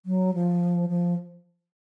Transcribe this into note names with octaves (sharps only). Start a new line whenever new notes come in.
F#3
F3
F3